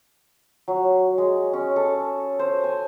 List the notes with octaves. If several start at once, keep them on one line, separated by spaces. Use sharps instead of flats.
F#3
G#3
C#4
A4
C5
G#5